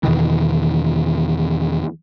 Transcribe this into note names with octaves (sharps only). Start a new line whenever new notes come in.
E2 B2 D#3 E3